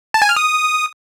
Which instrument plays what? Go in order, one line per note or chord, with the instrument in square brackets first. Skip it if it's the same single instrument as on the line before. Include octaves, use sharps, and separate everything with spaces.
[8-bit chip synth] A5
G#5
F6
D#6